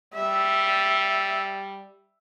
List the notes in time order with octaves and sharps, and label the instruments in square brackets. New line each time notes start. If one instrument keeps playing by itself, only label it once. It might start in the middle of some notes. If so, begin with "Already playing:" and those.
[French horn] G3 [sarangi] E5